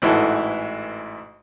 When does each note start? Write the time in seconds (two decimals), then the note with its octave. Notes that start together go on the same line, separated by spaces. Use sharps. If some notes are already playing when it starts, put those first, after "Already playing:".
0.02 A1 G#2 E3 E4 F#4 A4